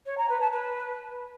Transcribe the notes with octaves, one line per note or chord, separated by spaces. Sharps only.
C#5
A#5
B4
A5
B4